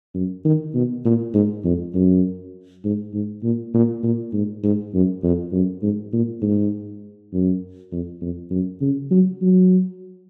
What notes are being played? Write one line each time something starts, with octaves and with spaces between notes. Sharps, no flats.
F#2
D#3
B2
A#2
G#2
F2
F#2
G#2
G#2
A#2
A#2
A#2
G#2
G#2
F#2
F2
F#2
G#2
A#2
G#2
F#2
F2
F2
F#2
C#3
F#3
F#3